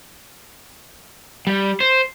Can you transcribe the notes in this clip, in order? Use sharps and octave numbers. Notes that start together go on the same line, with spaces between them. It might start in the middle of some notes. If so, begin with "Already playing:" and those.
G3
C5